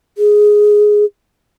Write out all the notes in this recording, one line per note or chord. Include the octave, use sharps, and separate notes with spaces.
G#4